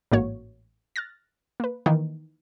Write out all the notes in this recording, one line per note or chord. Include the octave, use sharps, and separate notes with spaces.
A1 G#2 A#3 F#4 C#5
F6 F#6 A6 A#6
A#3 B4
D#3 E3 A#3 D#4